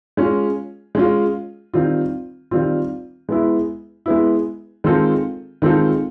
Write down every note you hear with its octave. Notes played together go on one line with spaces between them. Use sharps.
G#3 C#4 F4
G#3 C#4 F4
D#3 G3 C4 F4
D#3 G3 C4 F4
G#3 B3 E4
G#3 B3 E4
D#3 G#3 C4 F4 A4
D#3 G#3 C4 F4 A4